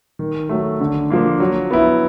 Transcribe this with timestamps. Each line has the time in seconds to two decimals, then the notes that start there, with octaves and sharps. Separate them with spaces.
0.19 D#3
0.49 F#3 A3
0.80 D3
1.10 F3 A#3 D4
1.40 F#3
1.71 B3 E4